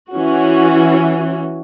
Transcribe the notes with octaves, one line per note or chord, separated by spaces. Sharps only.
E3 C#4 F#4